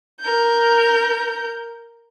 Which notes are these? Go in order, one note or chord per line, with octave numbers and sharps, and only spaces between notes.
A#4 G6